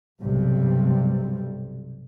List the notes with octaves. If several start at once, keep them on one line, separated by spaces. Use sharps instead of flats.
B1 G2 C3 G3